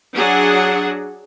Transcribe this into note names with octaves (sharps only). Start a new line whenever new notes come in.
F#3 D4 G#4 F#5